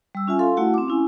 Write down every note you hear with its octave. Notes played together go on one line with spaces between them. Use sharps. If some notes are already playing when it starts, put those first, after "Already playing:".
G3 E6
C#4 F4 E5 G#5
A4 F5 C6
A3 E4 F#4 F#5
C4 D6
C#4 E4 G#5